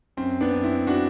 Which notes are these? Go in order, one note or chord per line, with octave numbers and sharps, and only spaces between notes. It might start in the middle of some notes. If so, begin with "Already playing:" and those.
F#2 C4
B3 D4
F#2
C4 E4
D4 F#4